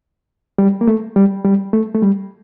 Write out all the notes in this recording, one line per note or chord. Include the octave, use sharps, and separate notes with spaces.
G3
A#3
A3
G3
G3
A3
A3
G3